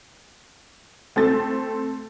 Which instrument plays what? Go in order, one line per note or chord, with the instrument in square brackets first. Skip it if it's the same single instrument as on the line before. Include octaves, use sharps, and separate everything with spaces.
[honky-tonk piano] A3 C4 A4 A6